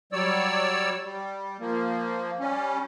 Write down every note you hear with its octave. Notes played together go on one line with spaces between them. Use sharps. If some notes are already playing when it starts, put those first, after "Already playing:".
F#3 G3 C#5 D5 E6
G3
F3 A#3
G3 C#4